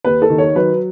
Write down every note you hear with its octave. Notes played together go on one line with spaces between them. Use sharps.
D#2 B4
A4
D#3
C#5
F#3 B4